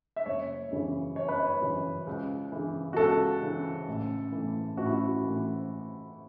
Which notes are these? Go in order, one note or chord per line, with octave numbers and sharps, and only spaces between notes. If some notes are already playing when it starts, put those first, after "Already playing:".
E5
F#1 C#5
F#2 C#3 E3
F#1 C#5
B4
C#5
F#2 C#3 E3
C#2
C#3 E3
F#4
C#2 A4
C#3 E3
A1
A2 E3
A1 F#4
E4
F#4
A2 E3